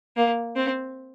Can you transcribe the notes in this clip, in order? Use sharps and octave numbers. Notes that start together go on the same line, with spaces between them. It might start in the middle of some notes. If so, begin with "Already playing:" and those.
A#3
C4